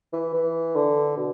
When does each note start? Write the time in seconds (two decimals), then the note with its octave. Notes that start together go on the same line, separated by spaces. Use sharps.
0.13 E3
0.34 E3
0.75 D3
1.17 B2